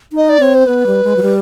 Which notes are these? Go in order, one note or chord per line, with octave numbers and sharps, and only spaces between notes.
D#4
D#5
D5
C4 C#5
C5
B3 B4
G3
G#3
F#3
G3